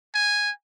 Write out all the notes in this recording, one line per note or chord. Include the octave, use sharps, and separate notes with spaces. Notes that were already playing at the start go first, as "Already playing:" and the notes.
G#5